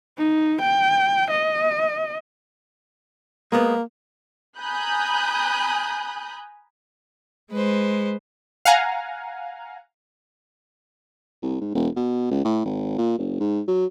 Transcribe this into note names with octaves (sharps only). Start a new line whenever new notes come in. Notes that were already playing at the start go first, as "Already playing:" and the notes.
D#4
G5
D#5
G#3 A#3 B3
G#5 A#5 B5 D#6 F#6 G6
G#3 B4 C5
F5 F#5 G#5 A#5
C2
G#2
E1
B2
C#2
A2
G#1
A#2
F#1
G#2
F#3